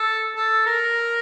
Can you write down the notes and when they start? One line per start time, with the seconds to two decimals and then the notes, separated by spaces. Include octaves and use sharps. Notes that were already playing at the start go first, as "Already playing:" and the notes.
Already playing: A4
0.35 A4
0.66 A#4